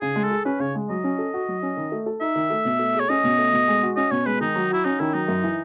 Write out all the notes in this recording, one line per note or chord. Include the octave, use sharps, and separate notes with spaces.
C#3 G#4
G#3
A4
G#4
C#4 B4
C#3 C#5
G#3
F#3 D#5
C#4
A4
F#4
F#3
C#4
D#3
A3
A4
D#4 E5
D#3
A3
B2
A3
G#4
C#5
C#4 D#5
B2
A3
B2
G#3
F#4
C#4 D#5
B2 C#5
G#3 B4
D#3 D#4
F#3
E4 F#4
C#4 D#4
D#3 E4
F#3 D#4
F#2
E3